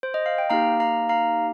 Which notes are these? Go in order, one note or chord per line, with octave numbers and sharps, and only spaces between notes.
C5
D#5
F5
G5
A#3 D#4 G4 F5 A#5
F5 A#5
F5 A#5